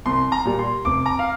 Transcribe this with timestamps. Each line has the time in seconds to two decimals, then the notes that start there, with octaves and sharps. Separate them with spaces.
0.06 C2 C6
0.32 A#5
0.45 A#2 G3
0.59 C6
0.85 F1 D6
1.06 A#5
1.19 F5